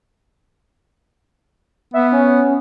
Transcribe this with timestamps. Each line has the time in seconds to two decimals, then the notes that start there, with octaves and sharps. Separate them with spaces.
1.94 B3 E5
2.12 C#4